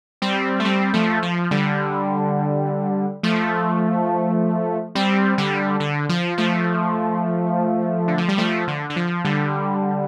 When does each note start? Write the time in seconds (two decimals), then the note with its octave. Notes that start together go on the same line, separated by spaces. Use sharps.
0.22 G3 C4
0.60 A3
0.65 G3 C4
0.93 F3 A3
1.23 F3
1.51 D3 G3
3.23 F3 A3
4.95 G3 C4
5.38 D3 G3
5.80 D3
6.09 F3
6.38 F3 A3
8.08 D3
8.18 F3
8.28 G3
8.38 F3 A3
8.68 D3
8.90 D3
8.96 F3
9.25 D3 G3